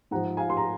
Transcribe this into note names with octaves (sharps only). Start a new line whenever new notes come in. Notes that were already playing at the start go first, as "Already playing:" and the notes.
G#2 F3 F#5 A#5
F5 G#5
C6
A#5